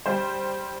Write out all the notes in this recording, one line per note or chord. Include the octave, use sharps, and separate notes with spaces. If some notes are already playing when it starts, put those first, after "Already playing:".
G3 C5